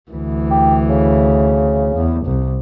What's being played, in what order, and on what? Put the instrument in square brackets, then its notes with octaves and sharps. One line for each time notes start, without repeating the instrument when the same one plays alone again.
[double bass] D2 E3
[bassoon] G4
C#3
[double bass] E2
C2